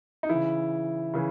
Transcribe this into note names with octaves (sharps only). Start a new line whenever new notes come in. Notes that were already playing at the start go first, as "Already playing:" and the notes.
D#4
C#3 E3 E4
C#3 E3